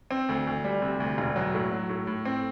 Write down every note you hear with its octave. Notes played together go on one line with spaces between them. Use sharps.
C4
D2
D2
G3
C3
D2
E1
F#3
A2
F#3
A2
A2
C4